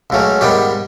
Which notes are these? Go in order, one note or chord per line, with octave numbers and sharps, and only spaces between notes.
C#2 C#3 F#3 A3 C#4
G#2 D#3 G3 B3 G4